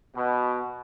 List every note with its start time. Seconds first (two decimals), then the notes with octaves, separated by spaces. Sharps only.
0.15 B2